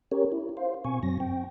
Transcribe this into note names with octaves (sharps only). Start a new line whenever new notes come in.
C#4 G4 A#4 C#5
E4
C5 F5
B2 C4 G#5 C#6
F#2 F#3 C4 A#6
C4 G5